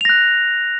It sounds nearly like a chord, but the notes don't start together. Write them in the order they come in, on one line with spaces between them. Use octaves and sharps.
F7 A#6 F#6